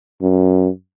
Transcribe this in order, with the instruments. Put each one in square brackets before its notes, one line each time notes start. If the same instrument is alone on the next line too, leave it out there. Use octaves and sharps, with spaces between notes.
[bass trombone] F#2